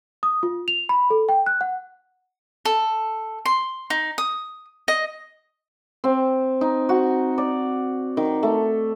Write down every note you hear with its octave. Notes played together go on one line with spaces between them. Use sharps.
D#6
F4
F7
B5
A4
G5
F#6
F#5
A4
C6
D#4
D#6
D#5
C4
D#4
F#4
D5
D#3
A3